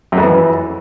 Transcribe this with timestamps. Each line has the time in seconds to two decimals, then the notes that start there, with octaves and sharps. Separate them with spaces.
0.12 F#2
0.17 F2
0.23 E3